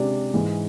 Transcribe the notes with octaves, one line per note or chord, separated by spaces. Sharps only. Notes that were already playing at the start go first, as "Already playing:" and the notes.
Already playing: C3 G#3 D4
G#2 E3 G#3